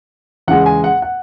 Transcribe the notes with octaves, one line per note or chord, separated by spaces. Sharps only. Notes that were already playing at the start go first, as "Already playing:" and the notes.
E2 C#3 G#3 F#5
G#5
F#5
F#5